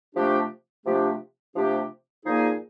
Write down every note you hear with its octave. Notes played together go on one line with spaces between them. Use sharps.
C3 F3 A3 D4 G4
C3 F3 A3 D4 G4
C3 F3 A3 D4 G4
A#2 F3 A#3 D#4 G#4